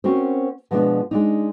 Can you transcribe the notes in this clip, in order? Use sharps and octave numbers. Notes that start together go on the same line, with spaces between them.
C4 C#4 F#4 A#4 C5
B2 F3 G#3 B3 C4 D4
G#3 D4 D#4